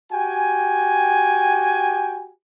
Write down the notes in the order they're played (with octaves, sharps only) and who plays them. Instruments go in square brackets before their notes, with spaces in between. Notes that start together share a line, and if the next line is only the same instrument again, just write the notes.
[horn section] F#4 G4 G5 G#5